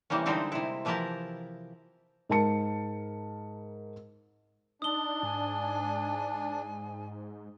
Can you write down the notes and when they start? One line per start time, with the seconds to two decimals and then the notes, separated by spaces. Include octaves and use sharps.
0.10 C3 E3 G3 A#3 C#4
0.26 D3 G3 G#3 C4 D#4 E4
0.52 C3 E4
0.85 E3 F3 E4 G4 A#4 A5
2.29 G#2 A#4 A5 C#7
4.82 D4 D#4 D#6 G7
5.23 G#2 G#5